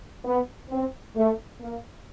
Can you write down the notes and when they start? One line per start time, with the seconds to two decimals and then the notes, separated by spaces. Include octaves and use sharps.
0.25 B3
0.70 C4
1.15 A3
1.61 A#3